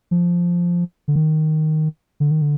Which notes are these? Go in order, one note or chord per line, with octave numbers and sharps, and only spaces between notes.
F3
D3
D#3
D3
D#3
D3